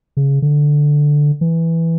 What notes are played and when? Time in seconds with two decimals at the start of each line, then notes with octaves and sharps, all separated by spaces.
0.17 C#3
0.42 D3
1.41 E3